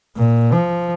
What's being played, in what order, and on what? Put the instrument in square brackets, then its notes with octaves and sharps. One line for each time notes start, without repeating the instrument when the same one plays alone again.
[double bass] A#2
F3